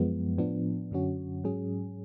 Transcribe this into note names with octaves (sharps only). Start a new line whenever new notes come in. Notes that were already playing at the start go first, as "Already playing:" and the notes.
Already playing: F#2 F3 G#3 B3
A2 F3 B3 D4
F#2 D3 F#3 C#4 F#4
G#2 F#3 C#4 G#4